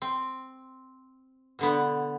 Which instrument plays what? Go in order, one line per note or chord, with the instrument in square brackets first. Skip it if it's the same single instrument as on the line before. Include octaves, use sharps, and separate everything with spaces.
[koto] C4
B2 D3 B3